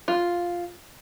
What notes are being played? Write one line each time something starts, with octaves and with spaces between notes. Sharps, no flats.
F4